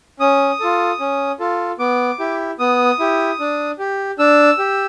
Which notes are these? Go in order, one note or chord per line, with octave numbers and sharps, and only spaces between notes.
C#4 D#6
F4 A4
C#4
F4 A4
B3 D6
E4 G4
B3 D#6
E4 G4
D4
G4
D4 E6
G4